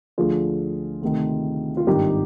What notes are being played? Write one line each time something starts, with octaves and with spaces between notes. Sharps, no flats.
D2 D3 F3 F4 G#4
D2 C3 D#3
F4
G#1 G2 D#3 D#4 G4